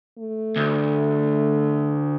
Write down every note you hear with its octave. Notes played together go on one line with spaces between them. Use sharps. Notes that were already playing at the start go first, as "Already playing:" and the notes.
A3
D2